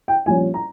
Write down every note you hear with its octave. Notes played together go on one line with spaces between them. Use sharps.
G5
A#1 A#2 G3 C#4 G#5
A#5